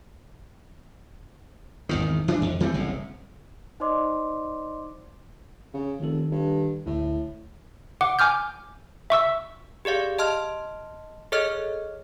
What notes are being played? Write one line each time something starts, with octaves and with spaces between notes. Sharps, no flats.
G#1 E2 D#3
E3 D4
F2
E3 G3 A3 C4
F#1 C2 A2
D#4 C5 D5 D#5 C6 D6
C#3
F1 D#3 A4
G2
D2 A2
F#5 D6
G#5 D6 F6 G6
E5 C#6 E6
G4 G#4 D5 F5
D#5 A5 C6 F6
G#4 A4 C#5 D#5 F6